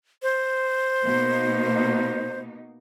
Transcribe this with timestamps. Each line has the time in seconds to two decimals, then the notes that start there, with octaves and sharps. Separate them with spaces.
0.22 C5
1.03 B2 A#3 D#4